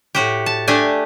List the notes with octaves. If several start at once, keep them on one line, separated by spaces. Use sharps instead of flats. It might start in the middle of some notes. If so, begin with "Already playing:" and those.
A2 F#4 G4
A5
A3 D4 G4 G#5